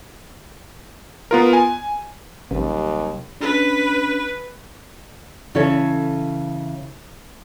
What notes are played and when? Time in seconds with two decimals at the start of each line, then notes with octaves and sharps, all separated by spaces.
1.31 B3 F4 A#4
1.53 G#5
2.51 A1 D#2 C3 F#3 G3
3.41 C#4 D4 B4
5.55 C#3 E3 E4 A4 C#5 A5